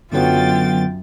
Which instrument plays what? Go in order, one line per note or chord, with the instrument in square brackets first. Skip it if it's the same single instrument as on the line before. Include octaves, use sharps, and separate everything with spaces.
[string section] F#2 A6 [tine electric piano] D3 F#3 B3 [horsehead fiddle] F4 G5